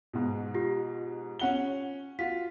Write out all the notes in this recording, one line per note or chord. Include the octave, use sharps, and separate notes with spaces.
G#2 B2
F4 G4
C#4 F#5 G7
F4 F#4 B6